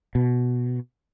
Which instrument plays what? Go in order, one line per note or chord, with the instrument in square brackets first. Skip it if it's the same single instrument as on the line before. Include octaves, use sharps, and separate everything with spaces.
[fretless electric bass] B2